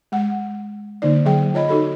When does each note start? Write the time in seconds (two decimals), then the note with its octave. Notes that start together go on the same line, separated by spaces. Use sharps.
0.12 G#3 F#5
1.02 D3 A#3 D#4 D5
1.25 D3 F#3 G#4 G5
1.54 F4 C#5 D#5 B5
1.69 D#4 F#4 A4 B5